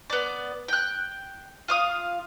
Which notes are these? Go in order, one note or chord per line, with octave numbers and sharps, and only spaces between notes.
B3 D5
G5 F#6
F4 F5 D#6